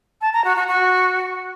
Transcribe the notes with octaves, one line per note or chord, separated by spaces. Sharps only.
A5
A#5
F#4
F#4
F#4